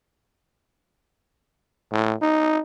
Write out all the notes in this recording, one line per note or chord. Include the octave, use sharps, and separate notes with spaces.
A2
D#4